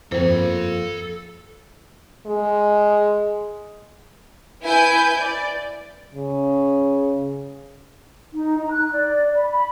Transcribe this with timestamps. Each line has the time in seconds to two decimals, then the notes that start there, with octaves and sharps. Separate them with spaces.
0.12 F2 A#3 F4 A4 C5 G5
2.26 G#3
4.62 E4 B4 G#5 G6
5.19 D5
6.14 C#3
8.32 D#4
8.58 A#5
8.71 F#6
8.92 D5
9.34 B5
9.51 B5